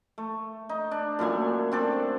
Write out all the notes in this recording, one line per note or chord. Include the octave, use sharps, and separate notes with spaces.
A3
D#4
D4
F#2 A#2 A3 G#5
C4 D4 A4